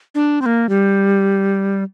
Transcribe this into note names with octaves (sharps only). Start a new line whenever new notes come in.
D4
C4
A#3
G3